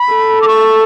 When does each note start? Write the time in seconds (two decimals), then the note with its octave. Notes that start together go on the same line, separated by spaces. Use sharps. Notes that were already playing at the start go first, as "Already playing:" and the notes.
Already playing: B5
0.14 A4
0.41 D6
0.47 C#6